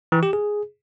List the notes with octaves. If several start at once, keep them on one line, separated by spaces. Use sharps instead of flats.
E3
G4
G#4